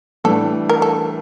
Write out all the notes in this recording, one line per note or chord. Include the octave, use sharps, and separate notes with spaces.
A2 E3 G3 D4 A4
A#4
A4